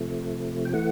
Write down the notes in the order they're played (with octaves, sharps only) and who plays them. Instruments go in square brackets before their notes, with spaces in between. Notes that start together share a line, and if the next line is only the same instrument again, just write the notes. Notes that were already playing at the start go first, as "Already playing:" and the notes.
Already playing: [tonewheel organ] C3 F3 A3
G5
E3 A3 F#5